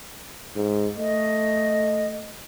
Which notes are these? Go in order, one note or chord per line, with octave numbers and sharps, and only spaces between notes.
G#2
A3 D#5